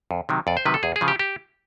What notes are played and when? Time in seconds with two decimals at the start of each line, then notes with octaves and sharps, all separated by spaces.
0.11 F2
0.29 C3 D#3 F#3
0.47 F2 D5
0.57 C5
0.65 C3 D#3 F#3 B4
0.74 A4
0.83 E2 G#4
0.96 G#4
1.01 C#3 F3
1.08 G4
1.19 G4